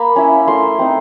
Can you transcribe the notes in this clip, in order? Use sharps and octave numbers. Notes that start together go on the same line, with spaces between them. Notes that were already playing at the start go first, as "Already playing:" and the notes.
Already playing: A#3 B5
C#4 E4
A3 C6
C4 D#4